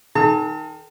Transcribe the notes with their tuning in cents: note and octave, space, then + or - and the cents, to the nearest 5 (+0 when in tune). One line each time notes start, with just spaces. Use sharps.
D#3 +0 A4 -45 A5 +45